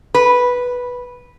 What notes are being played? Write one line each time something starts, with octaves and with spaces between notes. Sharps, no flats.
B4